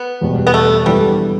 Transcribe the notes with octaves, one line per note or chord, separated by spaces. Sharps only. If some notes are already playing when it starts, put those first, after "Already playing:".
Already playing: B3
E2 B2 G3
B3
A3
G2 E3 G3 B3 E4 A4